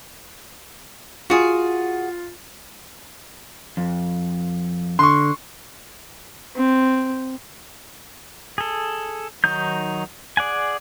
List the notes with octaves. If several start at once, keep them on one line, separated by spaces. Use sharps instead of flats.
F4 F#4 G#4
F2
D3 C6 C#6
C4
G#4 A4
D#3 F#3 D#4 G6
G#4 D5 F#5 G#5